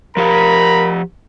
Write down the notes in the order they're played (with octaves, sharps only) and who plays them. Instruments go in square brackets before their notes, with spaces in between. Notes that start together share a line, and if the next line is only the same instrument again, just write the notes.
[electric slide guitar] F3 G4 F5 [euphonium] A#4 [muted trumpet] A#5 [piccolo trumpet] B5